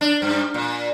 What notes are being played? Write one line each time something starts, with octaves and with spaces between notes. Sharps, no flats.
D4
G2
A#2